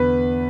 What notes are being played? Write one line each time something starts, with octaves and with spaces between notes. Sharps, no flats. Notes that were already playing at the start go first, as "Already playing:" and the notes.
Already playing: E2 D3 B4